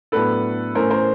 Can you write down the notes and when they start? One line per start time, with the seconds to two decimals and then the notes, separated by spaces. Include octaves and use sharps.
0.12 A2 F#3 B3 D4 A4 B4
0.75 A2 E3 A3 C#4 A#4 C5
0.90 A#4 C5